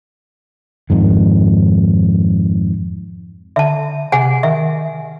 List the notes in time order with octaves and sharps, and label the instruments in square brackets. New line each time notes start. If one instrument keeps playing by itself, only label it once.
[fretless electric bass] F2 G#2 D#3
[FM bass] D3 [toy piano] E5 A5
[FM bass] C3 [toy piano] G#4 F#5 G#5
[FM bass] D#3 [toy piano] E5